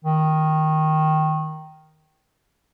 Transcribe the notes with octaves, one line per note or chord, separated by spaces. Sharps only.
D#3